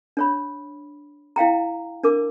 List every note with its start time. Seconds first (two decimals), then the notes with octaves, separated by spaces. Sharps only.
0.17 D4 C#5 B5
1.36 E4 F5 G5 A#5
2.03 D4 A#4 D6